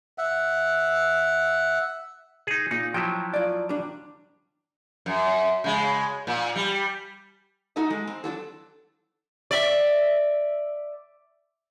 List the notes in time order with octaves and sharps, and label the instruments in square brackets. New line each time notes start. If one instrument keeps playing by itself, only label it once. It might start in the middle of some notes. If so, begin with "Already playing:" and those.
[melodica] E5 F#5
[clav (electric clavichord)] D#4 G#4
[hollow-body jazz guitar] A#2 [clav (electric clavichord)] D#4
[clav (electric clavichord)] F3 F#3 E4 [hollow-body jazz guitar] G5
[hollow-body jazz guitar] F4 D5
G3 D4
[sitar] F#2
C#3 G#3
A#2
G3
[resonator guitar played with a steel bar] A3 D#4 F#4 A4 D#5
G#3
C4
F#3 D4 F#4 A4
[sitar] D5 E5